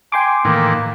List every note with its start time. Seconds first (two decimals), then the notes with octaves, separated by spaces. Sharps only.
0.12 G5 G#5 C6 D6
0.45 A2 D#3 E3 A#3